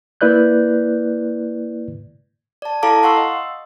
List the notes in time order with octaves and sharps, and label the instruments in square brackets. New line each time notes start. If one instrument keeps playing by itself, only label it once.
[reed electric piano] A#3 E4 B4 D5 F#6 G6
[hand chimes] D5 A5
E4 A4 F5 A5 A#5 D6
F5 F#5 C6 C#6 E6
D#5